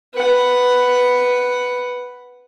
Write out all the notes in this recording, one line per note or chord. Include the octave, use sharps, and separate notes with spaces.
B4 F#5